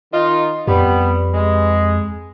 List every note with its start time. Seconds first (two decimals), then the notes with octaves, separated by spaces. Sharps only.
0.13 D#3 D#4 F4 D#5
0.67 F2 G3 B3 G4 B4 B5
1.34 G#3